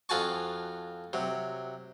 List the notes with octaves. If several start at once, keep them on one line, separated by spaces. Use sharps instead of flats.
F2 F4 F#4 G#5 A5 C#6
C3 F#3